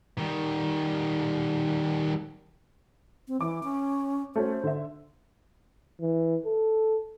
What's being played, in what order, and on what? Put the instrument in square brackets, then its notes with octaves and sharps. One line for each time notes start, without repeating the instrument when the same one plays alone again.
[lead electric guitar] D#3 G3
[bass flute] C4
[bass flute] E3 [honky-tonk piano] D6
[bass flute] C#4
[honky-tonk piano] A3 C#4 F#4 [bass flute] C5
[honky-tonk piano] D3 E5
[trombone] E3
A4